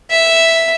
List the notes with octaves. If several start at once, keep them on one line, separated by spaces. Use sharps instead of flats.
E5